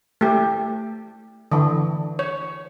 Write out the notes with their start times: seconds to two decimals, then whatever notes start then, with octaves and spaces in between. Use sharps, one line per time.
0.21 A3 G4
1.52 D3 E3
2.19 C#5